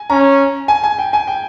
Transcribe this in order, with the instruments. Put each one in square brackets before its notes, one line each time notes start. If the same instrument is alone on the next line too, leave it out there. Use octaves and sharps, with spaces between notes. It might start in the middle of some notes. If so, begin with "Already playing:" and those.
Already playing: [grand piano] G#5
[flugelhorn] C#4 [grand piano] A#5
[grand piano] G#5
G#5
G5
G#5
G5